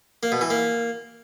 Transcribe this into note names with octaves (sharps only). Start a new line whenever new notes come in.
A#3
B2
E3
A#3